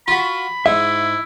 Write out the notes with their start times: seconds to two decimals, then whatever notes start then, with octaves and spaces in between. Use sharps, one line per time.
0.08 F4 F#4 B5
0.66 G#2 E4 E5